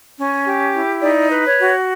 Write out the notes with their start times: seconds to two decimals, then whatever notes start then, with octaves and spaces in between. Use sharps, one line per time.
0.18 C#4
0.45 G4
0.74 E4
1.02 D#4 D5
1.30 B4
1.46 C#5
1.60 F#4